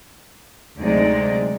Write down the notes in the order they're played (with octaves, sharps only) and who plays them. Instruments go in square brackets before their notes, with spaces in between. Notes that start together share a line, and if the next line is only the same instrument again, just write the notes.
[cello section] D2 C3 F#3 G#3 D#4 D5